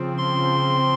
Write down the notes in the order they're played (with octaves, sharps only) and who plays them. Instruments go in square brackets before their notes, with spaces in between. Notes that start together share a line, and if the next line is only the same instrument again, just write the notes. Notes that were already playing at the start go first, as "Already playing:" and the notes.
Already playing: [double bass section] C#3 F3 C4
[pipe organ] C6